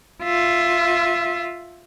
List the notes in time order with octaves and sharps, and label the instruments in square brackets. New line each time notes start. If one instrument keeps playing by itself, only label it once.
[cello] F4 E5